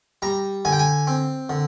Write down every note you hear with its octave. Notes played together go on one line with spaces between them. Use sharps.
G3 A#5
D3 G#5
G5
G#5
C4
D3